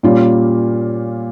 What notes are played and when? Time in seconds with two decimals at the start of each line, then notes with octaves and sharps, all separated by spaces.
0.03 A#2 G3 C#4 F4